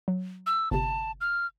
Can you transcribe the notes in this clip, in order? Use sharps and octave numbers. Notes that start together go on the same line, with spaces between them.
F#3
E6
G1 C3 A5
F6